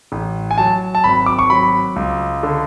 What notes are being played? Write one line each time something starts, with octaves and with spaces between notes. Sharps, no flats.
A1
G#5
F#3 A5
A5
G#1 B5
D6
C#6
F#3 B5
C#2
D3